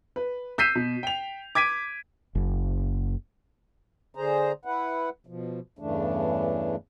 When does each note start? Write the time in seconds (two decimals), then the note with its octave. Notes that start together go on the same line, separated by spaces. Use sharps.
0.16 B4
0.58 E6 G6 B6 C7 D#7 E7
0.75 B2
1.03 G5 F7
1.55 D6 G#6 B6 D7 D#7
2.35 F#1
4.15 D3 G#4 C5 A#5
4.65 E4 B4 F#5
5.27 B2 F3
5.79 E2 G2 C#3 E3 A3 D4